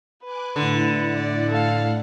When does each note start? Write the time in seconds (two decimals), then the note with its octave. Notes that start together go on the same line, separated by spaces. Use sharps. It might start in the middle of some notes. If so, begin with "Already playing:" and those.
0.24 B4 G#5 D6 F#6
0.56 A2 D3 E4 F#5
1.16 D5
1.49 A4 F5